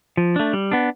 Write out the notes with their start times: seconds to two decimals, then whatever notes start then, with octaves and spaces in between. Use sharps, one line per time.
0.17 F3
0.36 A3 D4
0.53 G3
0.72 B3 D4